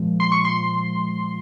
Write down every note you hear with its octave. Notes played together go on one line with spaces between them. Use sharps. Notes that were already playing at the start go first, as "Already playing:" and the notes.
Already playing: A#2 F3 G#3
C6
C#6
C6